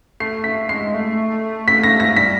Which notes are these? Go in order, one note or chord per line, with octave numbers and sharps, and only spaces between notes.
A3 C7
B6
G#3 C7
A3
B6
A#6
A#6
G3 B6